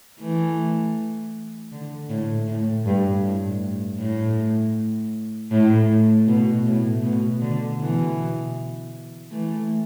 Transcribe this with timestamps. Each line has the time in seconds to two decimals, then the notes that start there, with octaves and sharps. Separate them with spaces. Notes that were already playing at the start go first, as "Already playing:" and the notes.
0.20 E3 A3
1.72 D3
2.09 A2
2.47 A2
2.86 G2
3.24 A2
4.00 A2
5.51 A2
6.27 B2
6.66 A2
7.03 B2
7.41 D3
7.79 B2 E3
9.31 E3 A3